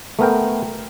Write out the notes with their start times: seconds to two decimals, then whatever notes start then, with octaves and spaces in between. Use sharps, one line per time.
0.19 A3 B3 A#4 G5